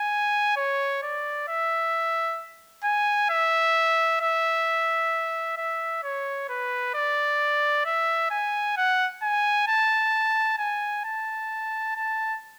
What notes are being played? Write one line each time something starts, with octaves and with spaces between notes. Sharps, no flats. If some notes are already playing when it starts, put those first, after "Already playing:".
Already playing: G#5
C#5
D5
E5
G#5
E5
E5
E5
C#5
B4
D5
E5
G#5
F#5
G#5
A5
G#5
A5
A5